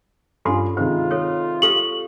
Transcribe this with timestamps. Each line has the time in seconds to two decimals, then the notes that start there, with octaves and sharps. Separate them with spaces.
0.45 G2 C#4 F4 A4 B5 C6
0.77 G#2 C3 D#3 F4 C5
1.11 A4 C#5
1.62 G4 A4 F5 F#7